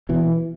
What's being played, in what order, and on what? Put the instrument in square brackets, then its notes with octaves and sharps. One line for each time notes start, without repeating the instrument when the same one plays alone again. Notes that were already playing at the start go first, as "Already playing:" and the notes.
[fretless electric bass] B2 E3